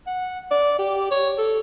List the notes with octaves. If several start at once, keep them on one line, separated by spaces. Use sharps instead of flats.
F#5
D5
G4
C#5
A4